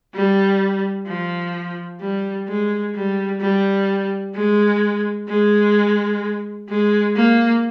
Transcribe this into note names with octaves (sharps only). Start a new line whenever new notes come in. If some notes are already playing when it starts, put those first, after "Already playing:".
G3
F3
G3
G#3
G3
G3
G#3
G#3
G#3
A#3